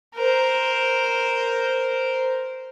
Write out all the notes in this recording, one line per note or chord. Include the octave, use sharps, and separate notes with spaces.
A#4 C5